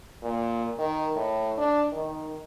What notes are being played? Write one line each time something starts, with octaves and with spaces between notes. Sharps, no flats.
A#2
D#3
A2
D4
D#3